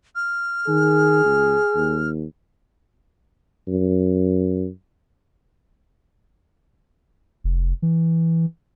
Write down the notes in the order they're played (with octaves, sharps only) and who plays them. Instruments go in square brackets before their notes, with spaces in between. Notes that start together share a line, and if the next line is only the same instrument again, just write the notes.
[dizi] F6
[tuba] D#3 [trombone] G#4
[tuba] C#2
D#2
F#2
[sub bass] F1
E3